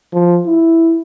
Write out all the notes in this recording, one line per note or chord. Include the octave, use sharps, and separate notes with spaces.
F3
E4